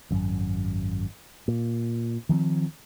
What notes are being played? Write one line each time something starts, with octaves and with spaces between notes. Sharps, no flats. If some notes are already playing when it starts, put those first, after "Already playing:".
G#1 F#2
A#2
D#3 F3 B3 C4